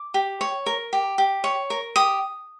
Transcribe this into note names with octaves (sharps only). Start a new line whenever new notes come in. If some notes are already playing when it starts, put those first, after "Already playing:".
Already playing: D6
G4
C#5
A#4
G4
G4
C#5
A#4
G4 D#6